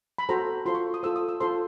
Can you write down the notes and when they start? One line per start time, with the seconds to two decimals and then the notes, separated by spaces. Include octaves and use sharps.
0.18 B5
0.29 F#4 A4 C5 A#5
0.66 F4 A4 C5 C6
0.75 C#6
0.94 D#6
1.03 F4 A4 C5 E6
1.16 D#6
1.29 E6
1.40 F4 A4 C5 C6